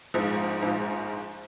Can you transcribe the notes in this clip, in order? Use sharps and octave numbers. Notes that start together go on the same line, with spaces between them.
A#1 G#2 F3
A#1 G#2 F3